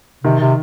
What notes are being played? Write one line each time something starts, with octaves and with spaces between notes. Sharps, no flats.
C3 D#3
C3